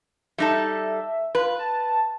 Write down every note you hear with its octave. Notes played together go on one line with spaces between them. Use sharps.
G3 D#4 A4 E5
F4 B4
A5